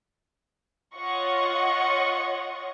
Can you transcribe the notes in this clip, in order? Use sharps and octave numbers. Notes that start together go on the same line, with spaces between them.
F4 C#5 D#5 F#5 C#6